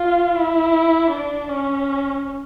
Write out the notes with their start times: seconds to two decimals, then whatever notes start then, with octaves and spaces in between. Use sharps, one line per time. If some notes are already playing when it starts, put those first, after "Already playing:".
Already playing: F4
0.35 E4
1.10 D4
1.49 C#4